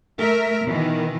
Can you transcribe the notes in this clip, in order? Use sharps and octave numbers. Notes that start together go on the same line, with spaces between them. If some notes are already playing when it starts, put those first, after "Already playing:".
A3 A#4 E5
B2 D#3 E3